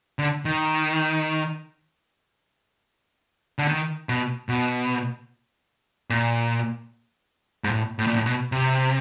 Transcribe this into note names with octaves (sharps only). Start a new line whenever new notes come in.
D3
D#3
D3
D#3
B2
B2
A#2
G#2
A2
A2
A#2
A2
B2
C3